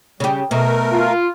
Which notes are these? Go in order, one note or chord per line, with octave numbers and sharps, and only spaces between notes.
C#3 G3 G4
B2 A3 A#4
F4